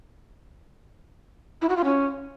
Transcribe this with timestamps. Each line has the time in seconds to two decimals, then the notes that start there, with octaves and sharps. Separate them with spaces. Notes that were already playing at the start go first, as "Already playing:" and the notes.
1.62 E4
1.69 F#4
1.77 F4
1.84 C#4